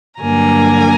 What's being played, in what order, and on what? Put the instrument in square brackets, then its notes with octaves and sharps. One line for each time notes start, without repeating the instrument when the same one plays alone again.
[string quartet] G2 D3 F#3 A#3 G#5 A#5